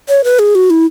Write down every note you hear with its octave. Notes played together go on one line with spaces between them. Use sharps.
C#5
B4
G#4
F#4
E4